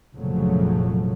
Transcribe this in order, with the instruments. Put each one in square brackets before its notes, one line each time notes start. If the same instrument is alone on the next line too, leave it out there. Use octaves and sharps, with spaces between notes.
[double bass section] F1 A#2 C#3 F3 F#3 A3